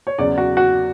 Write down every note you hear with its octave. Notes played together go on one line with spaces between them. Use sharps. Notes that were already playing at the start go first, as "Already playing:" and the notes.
C#5
E2 C#3 F#3 D5
F#4
F#4